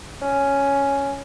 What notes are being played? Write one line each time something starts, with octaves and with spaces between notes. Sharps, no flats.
C#4